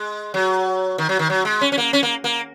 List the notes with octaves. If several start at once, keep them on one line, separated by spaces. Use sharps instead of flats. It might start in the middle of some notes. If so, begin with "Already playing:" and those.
Already playing: G#3
F#3
D#3
F#3
D#3
F#3
G#3
C#4
C#4
A#3
C#4
A#3
A#3